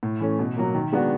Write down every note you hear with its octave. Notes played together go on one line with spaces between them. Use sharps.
A2
E3 A3 C#4
B2
F#3 A#3
D#3
G#3 B3 D4 F#4